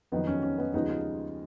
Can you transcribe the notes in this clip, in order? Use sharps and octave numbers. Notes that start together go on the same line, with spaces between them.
F2 D#3 F#3 B3 D#4
C#4
C#4
B3 D#4
D#2 C#3 F3 G#3 B3 D#4
F4